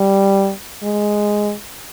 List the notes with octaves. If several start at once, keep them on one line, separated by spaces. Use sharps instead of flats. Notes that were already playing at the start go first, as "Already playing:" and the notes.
Already playing: G3
G#3